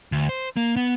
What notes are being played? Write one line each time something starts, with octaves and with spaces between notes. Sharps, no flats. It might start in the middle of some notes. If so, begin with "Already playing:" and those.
D2
C5
A#3
B3